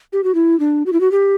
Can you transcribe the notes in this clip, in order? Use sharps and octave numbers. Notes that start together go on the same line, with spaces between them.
G4
F#4
E4
D4
F#4
E4
F#4
G4